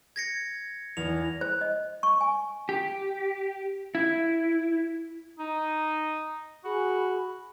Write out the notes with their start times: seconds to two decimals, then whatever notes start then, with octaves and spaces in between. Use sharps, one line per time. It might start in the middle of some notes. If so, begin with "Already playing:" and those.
0.16 G#6 A#6 C#7
0.97 E2 F7
1.41 C5
1.61 D#5
2.03 C#6
2.21 G#5
2.69 G4
3.95 E4
5.39 D#4
6.64 F#4 G#4 B5